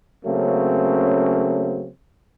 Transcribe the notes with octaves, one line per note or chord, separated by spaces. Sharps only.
C#3 F#3 A3 A#3 C4 C#4